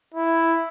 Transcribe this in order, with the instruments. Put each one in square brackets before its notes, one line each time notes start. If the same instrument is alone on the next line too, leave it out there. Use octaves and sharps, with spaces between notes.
[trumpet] E4